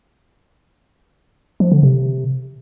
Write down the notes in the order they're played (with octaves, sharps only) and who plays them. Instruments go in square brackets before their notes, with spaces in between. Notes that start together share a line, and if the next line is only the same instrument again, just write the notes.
[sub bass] F3
D3
C3